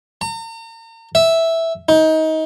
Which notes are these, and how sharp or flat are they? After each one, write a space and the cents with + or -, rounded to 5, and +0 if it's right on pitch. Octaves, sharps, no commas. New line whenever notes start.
A#5 -40
E5 -5
D#4 +25